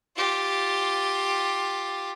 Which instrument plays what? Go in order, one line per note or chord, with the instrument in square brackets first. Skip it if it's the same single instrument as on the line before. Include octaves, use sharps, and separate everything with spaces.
[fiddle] F4 G4